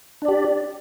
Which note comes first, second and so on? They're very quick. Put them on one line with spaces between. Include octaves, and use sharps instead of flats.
D4 D5 G4